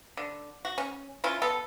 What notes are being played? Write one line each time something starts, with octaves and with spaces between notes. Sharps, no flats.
D3
F#4
C#4
C#4 E4 F4
B3 A4